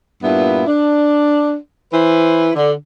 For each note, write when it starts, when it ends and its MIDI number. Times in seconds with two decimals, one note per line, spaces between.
0.23 0.67 43
0.23 0.67 46
0.23 0.67 59
0.23 0.67 64
0.67 1.56 62
1.93 2.51 52
1.93 2.51 64
1.93 2.51 71
1.93 2.51 72
2.55 2.73 50